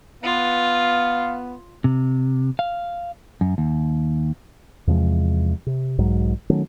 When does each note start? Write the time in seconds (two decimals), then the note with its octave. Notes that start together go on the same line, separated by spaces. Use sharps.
0.24 B3 F4 F5
1.84 C3
2.59 F5
3.41 F#2
3.58 D#2
4.87 E2 C3 F3 G#3
5.66 C3
5.98 B1 G#2 F#3 G#3
6.50 D#3 F#3 A3 C#4